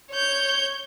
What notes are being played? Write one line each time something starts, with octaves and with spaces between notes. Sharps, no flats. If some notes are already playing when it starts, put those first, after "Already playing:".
C#5 G6